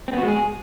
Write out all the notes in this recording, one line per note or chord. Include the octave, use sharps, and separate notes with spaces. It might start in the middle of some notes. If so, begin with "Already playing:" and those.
C4
B3
F#4
G#3
G#4